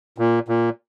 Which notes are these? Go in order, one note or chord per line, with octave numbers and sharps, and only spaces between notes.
A#2
A#2